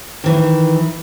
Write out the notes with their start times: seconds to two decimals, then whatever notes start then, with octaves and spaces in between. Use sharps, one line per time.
0.24 D#3 E3